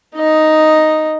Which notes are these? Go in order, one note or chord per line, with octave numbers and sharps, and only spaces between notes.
D#4 D#5